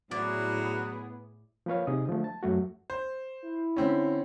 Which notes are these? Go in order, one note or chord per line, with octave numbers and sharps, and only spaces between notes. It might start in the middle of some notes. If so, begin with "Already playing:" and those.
A2 F#3 B3 E4 G#4 D5
F3 A#3 B4 C#5 F5
C3 D#4 G#4 D#6
D3 F3 G#3 A3
A5
F#2 F#3 A3 F#4
C5
E4
D3 C4 C#4